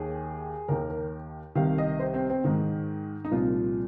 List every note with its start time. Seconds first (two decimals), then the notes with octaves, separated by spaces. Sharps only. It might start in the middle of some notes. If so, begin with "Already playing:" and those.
Already playing: D#2 D#3 G#4
0.68 D#2 D#3 A#4
0.90 A#4
1.55 C2 C3 D#3 F5
1.78 D#5
1.99 C5
2.14 C4
2.30 C4
2.44 G#2 D#3 D#4
3.25 D#4
3.31 C2 A#2 F3 F4